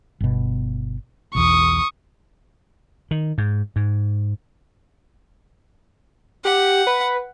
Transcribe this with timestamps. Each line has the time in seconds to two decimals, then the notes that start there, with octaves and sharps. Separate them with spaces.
0.20 G1 B2
1.35 B1 E2 C#6 D#6
3.11 D#3
3.38 G#2
3.76 G#2
6.45 G4 F#5
6.87 B4